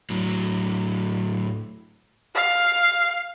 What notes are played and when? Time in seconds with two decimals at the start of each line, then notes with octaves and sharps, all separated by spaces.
0.10 A2 F#3
2.35 F5